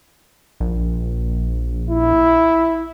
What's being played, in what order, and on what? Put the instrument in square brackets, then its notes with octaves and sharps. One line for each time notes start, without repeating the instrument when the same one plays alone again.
[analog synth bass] A#1
[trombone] E4